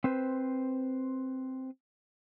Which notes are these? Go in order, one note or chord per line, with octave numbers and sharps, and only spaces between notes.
C4 B4 C5